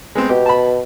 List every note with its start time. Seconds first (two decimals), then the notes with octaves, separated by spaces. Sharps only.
0.15 G#3 B3 C4
0.29 B2 G4
0.46 A5 B5